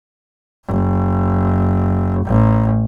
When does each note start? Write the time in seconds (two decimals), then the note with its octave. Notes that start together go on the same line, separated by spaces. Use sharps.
0.67 F#1
2.26 A1